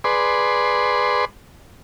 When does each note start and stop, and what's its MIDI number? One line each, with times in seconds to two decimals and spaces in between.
0.04 1.25 68
0.04 1.25 71
0.04 1.25 74
0.04 1.25 84